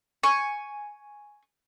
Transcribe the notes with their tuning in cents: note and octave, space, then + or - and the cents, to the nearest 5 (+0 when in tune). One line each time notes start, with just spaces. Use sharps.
G#5 +0 C#6 +0